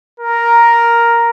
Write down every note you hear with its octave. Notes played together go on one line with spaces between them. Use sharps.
A#4